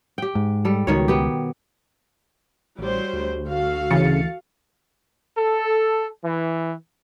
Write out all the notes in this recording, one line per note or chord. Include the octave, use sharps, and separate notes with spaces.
G4 G5
G#2
G3 A4
C#2 B2 D#3 C#5
B3 G4
A1 F#3 G3 C5
D2
F#4 A4 F5
C#3 E3 A6 C#7
A4
E3